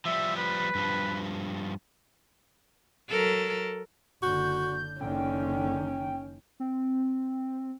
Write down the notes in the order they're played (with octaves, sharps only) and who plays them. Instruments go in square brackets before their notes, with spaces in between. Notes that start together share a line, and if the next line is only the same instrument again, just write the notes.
[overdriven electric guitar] F3 G3 [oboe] E5
[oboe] B4
[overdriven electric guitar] G2 F3
[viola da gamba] F#3 A4 A#4
[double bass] F#1 D3 [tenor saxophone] F#4 [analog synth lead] G6
[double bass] F#1 D#3 [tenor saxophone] D3 [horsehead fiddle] C#4 [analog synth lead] G5
[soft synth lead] C4